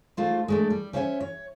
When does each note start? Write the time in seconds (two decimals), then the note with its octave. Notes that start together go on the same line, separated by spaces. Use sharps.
0.17 G#2 A3 F4 C5
0.48 G#3 A3 D4
0.70 G3
0.93 C#4 C5 C#5 E5 F5 G#5
1.20 C#5